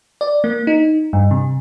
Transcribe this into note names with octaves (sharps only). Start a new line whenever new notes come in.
D5
A#3
D#4
G2
C3